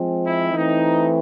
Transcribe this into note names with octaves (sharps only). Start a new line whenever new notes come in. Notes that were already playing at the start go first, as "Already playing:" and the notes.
Already playing: F3 G#3 C4
E4
E3 A3 C4 D#4